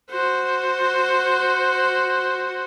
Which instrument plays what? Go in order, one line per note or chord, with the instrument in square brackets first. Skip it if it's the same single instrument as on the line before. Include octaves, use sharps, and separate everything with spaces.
[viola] F#4 C5